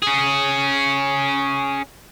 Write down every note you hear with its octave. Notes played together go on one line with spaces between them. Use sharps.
C#4 G#4